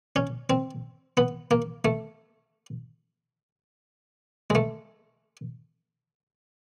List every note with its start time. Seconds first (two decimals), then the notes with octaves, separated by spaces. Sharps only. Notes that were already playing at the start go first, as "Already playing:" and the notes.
0.16 C#4
0.50 C4
1.17 B3
1.51 A#3
1.85 A3
4.50 G#3
4.55 A3